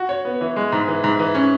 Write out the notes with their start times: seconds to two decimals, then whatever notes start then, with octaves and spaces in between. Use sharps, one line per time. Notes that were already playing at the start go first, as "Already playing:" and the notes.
Already playing: F#4
0.09 C#5
0.25 B3
0.41 E3
0.56 G#3
0.72 G#2
0.88 E3
1.04 G#2
1.19 E3
1.35 C#4